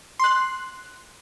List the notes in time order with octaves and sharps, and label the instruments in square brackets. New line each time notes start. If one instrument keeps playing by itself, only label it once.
[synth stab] C6 F#6